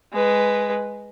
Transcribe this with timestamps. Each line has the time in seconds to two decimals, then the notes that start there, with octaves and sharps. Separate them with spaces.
0.13 G#3 B4